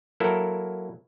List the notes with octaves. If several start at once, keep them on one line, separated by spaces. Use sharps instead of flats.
F#3 A#3 E4 A4 A#4